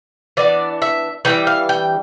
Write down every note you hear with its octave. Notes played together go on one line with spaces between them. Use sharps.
E3 B3 D4 D5
E5
E3 G3 D4 G5
F5
G5